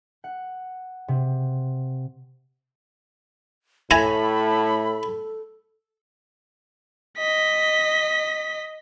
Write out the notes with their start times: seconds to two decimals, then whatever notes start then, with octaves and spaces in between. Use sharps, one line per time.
0.24 F#5
1.08 C3
3.91 A2 E4 A4 G#5 A#5 B5
7.18 D#5 B6